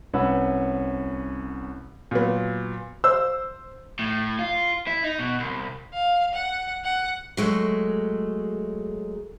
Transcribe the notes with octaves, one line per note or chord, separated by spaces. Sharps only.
C2 C#4 B4 C#5 F#5 E6
A#2 F#3 B3
C5 E6
A2
F4
E4
D#4
B2
C2
F5
F#5
F#5
F#3 G#3 A3